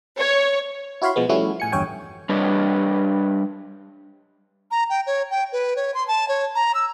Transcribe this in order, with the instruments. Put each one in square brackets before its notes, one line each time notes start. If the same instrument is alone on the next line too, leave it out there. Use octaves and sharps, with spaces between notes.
[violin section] C#5
[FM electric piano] E4 F#4 C#5 F5 B5 C6
B2 F3 G#3 B3
F3 G3 A3 C#4 E4 F#4
A2 G#5 C#7
G1 E2 G2 C#5 G5 G#5
[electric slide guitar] G3 D4 B4 C#5 D#5
[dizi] A#5
G5
C#5
G5
B4
C#5
C6
A5
C#5
A#5
E6